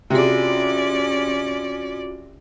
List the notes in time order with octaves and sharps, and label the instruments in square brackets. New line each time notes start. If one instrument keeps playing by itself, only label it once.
[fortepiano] C3 G#4 [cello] C#4 D5 [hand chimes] F4 F#4